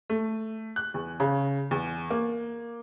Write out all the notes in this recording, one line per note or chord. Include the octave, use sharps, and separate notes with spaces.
A3
F#6
E2
C#3
E2
A#3